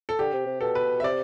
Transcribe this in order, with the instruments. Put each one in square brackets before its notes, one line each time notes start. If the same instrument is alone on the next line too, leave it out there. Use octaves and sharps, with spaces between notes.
[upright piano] A4
[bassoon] D3 [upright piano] G4
[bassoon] C3
C3
[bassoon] B2 [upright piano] A4
[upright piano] B4
E5
[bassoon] C3 [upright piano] D5